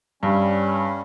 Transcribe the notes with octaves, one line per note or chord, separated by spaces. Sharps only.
G2 G3 C#4